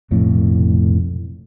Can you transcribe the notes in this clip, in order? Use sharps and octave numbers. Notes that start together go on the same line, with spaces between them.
F1 B1 F2 A2